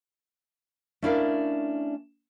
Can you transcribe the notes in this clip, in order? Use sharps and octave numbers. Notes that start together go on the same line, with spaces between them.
A3 C#4 D4 E4 A#4 F5